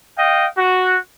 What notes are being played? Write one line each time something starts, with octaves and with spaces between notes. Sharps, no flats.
D#5 F5 G5
F#4